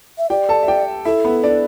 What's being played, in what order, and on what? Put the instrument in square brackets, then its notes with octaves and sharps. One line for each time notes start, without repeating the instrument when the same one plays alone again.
[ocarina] E5
[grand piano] G4 G5 [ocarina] D5
[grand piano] A4 A5
E5
G4 G5
[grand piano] E4 E5 [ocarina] A4
[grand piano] B3 B4
D4 D5